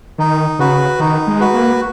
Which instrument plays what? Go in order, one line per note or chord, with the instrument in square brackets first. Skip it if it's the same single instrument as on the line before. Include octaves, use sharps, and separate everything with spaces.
[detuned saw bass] D#3 [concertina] D#4
[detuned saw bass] C#3 [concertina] F#4 B4
[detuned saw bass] D#3 [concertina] D#4
[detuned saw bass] G#3
[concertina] F#4 B4
[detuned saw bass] A#3